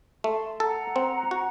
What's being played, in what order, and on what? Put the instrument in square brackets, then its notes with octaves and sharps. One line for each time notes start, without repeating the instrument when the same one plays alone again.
[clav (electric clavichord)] A3 [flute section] A5 C6
[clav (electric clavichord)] A4 [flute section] F#5 A#5
[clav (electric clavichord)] C4
F#4